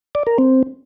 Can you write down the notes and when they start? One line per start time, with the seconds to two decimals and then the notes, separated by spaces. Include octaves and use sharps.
0.15 D5
0.27 A#4
0.38 C4